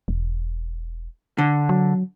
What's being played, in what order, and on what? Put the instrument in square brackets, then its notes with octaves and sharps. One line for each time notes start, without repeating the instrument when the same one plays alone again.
[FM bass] E1
[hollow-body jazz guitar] D3
[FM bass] F#3